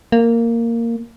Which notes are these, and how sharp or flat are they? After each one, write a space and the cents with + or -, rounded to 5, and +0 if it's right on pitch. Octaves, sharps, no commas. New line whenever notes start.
A#3 -10